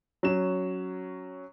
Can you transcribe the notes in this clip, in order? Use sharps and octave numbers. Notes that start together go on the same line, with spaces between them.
F#3 C#4 E7